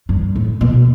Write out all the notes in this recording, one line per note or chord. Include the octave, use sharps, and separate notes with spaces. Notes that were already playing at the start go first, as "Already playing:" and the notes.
G2
A2
B2